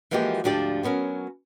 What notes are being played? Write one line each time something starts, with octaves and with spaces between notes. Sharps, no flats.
E3 F3 G#3 A#3 F#4 G4
D2 G#2 F3 D4 G4 D5
F#3 B3 C#4 A#4